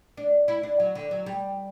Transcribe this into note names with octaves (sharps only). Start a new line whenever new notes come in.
D4
E4
D4
F#3
D3
F#3
G3